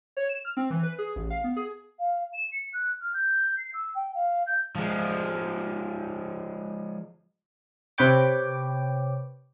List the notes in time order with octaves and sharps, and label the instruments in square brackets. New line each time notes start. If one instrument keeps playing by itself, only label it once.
[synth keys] C#5
E7
F6
C4
E3
B4
G#4
A1
F5
B3
G#4
[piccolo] F5
E7
C#7
F#6
F6
G6
C7
E6
G5
F5
G6
[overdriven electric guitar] F3 G#3
[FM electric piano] C3 C4 B4 C#5 G5 D6